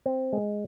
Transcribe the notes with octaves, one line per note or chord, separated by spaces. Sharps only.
C4
G#3